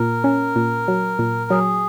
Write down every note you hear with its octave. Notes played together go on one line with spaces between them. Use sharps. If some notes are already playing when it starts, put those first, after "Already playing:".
Already playing: A#2 A#4
C#4
A#2
F#3
A#2
F#3 G#4